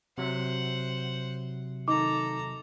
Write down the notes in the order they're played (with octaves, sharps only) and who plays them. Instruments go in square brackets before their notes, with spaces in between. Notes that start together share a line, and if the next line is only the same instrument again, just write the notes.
[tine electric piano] C3 F#3 E5 [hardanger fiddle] C5 F#5
[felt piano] D#3 [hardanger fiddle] A4 A#5 [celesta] D6